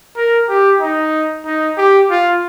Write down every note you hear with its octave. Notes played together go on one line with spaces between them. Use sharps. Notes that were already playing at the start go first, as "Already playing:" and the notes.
A#4
G4
D#4
D#4
G4
F4